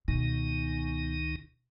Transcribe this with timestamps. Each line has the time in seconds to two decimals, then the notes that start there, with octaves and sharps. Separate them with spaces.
0.08 C#2 B2 D#3 D#4